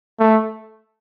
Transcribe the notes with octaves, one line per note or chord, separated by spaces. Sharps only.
A3